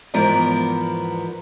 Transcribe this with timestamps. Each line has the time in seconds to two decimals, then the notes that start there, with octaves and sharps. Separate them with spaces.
0.14 E2 G#2 F3 B3 A#4 D5